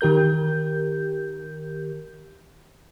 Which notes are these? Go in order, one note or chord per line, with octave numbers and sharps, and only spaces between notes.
D#3 G4 A#4 G6